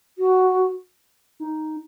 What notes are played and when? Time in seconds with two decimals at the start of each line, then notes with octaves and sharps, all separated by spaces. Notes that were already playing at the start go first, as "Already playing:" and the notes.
0.18 F#4
1.40 D#4